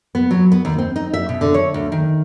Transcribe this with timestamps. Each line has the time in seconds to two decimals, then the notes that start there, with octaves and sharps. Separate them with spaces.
0.15 B3
0.31 F#3
0.52 B3
0.65 D#2
0.78 C4
0.96 D#4
1.14 E5
1.29 B2
1.41 D3
1.54 C#5
1.74 D2
1.92 D#3